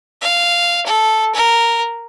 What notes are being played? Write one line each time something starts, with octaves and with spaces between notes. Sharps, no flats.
F5
A4
A#4